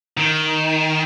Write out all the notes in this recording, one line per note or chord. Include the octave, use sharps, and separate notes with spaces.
D#3